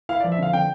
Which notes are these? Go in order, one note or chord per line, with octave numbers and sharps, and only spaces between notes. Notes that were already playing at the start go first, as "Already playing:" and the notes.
E4 F5
D5
F3
E5
D3 F5
D3 G5